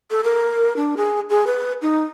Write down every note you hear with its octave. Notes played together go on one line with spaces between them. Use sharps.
A4
A#4
D4
G#4
G#4
B4
D#4